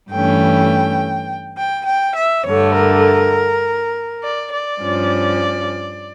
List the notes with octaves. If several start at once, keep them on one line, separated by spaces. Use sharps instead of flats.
G2 E3 A3 C#4 G5
G5
G5
E5
G2 D3 A3 C#5
A#4
D5
D5
G2 F3 C#4